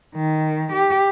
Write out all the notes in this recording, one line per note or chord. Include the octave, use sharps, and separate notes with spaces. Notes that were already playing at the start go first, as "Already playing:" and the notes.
D#3
G4